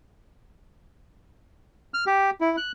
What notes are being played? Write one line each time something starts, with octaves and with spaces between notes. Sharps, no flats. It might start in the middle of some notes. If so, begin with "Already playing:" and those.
F6
G4
E4
F#6